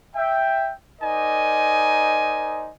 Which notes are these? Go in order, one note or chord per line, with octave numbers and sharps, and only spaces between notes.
E5 G5
D#4 A#4 C5 D5 D#5 G#5